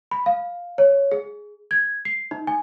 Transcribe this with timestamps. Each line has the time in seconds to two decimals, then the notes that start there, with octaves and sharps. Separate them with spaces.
0.11 B5
0.26 F5
0.78 C#5
1.12 G#4
1.71 G#6
2.05 C7
2.31 D#4
2.47 G#5